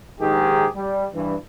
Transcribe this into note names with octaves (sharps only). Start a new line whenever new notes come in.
A#1 G#2 D#3 D#4 G4 G#4
G3
G2 E3